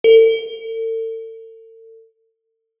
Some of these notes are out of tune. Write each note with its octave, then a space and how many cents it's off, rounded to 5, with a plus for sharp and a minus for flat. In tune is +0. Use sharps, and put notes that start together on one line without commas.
A4 +40